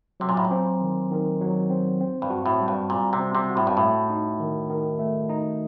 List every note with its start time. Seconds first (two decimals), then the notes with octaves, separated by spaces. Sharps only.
0.20 C3 F#3
0.29 A#2
0.37 A2
0.45 A#2
0.51 C4
0.81 D#3
1.11 D#3
1.41 F#3
1.70 C4
2.01 C4
2.22 G2
2.30 F#4
2.46 A2
2.60 G3
2.68 G2
2.90 A#2 G3
3.13 C3
3.19 C4
3.35 C3
3.50 F#4
3.57 A2
3.67 G2
3.77 A2 A3
4.10 D#4
4.40 D#3
4.69 D#3
4.99 A3
5.29 D#4